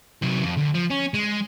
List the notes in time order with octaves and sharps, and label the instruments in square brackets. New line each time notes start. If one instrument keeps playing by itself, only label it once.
[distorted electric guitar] C3 F#3
F2
D2
F3
C#4
G#3